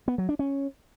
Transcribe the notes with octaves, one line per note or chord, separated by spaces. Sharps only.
B3
F#3
D4
C#4